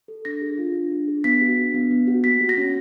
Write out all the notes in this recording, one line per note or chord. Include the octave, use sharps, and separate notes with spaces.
A4
D4 A#6
G#4
F4
D4
D4
G#4
B3 B6
F#4
D4
B3
B3
F#4
A#3 B6
F#4
A#6
C#4